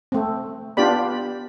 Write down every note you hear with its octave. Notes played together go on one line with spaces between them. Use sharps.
A3 C4
B3 D4 F4 G4 D5 B5